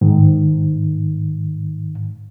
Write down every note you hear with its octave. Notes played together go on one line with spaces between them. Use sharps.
G#2 D#3